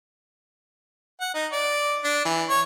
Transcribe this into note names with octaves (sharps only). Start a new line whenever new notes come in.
F#5
D#4
D5
D4
E3
C#5